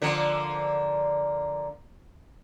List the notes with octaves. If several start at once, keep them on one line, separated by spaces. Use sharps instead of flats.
D3 F3 A#3